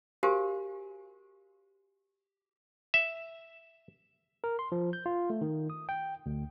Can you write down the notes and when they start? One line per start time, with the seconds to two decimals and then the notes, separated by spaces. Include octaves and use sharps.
0.23 F#4 G4 A#4 C5 F5 G#5
2.94 E5
4.44 A#4
4.59 C6
4.72 F3
4.93 G6
5.06 F4
5.30 A3
5.41 D#3
5.70 D#6
5.89 G5
6.26 D2